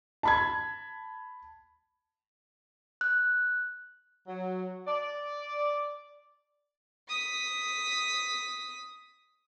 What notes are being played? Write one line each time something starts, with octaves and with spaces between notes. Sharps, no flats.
A5 B5 G#6
F#6
F#3
D5
D#6 B6